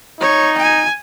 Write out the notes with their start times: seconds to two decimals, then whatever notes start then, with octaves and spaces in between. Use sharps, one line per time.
0.21 D#4 C#5
0.58 G#5